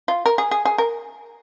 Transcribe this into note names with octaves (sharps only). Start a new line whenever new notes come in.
F4
A#4
G#4
G#4
G#4
A#4